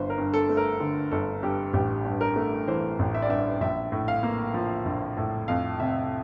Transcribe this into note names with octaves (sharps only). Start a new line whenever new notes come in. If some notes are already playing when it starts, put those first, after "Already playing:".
Already playing: G1 C5
A#4
G2
A4
A3
A#4
D3
G1 A4
G2 G4
A1 G4
G2
A#4
A3
E3 C5
A1
E5
D5
G2 E5
A#1 E5
A2
F5
A#3
F3
A#1
A2
F2 F5
C3 E5